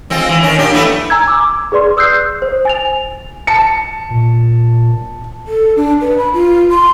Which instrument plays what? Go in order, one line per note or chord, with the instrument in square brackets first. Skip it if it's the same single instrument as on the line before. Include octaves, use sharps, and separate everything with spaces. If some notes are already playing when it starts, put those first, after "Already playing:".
[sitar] G#3 C4 F4
E3
D#3 C#4
A#2 D4 G4
A3 B3 E4
[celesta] G#5 A#5 E6 G#6
D6 E6
G#4 B4 D5 C6
D#6 E6 F#6 G6 C7
C5
G#5 A6 F7
[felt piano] A5 C#7
[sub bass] A#2
[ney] A4
D4
B4
B5
F4
C6